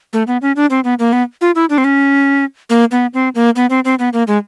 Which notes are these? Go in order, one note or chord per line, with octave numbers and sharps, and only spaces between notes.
A3
B3
C#4
D4
C4
B3
A#3
B3
F4
E4
D4
C4
C#4
A#3
B3
C4
A#3
B3
C4
C4
B3
A#3
G#3